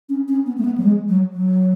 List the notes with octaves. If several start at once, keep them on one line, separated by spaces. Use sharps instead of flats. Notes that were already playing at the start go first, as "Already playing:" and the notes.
C#4
C#4
B3
A3
B3
F#3
G#3
F#3
F#3